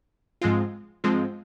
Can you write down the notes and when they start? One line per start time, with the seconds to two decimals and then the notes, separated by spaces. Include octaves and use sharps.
0.41 G#2 F3 G#3 C4 F4
1.04 G#2 F3 G#3 C4 F4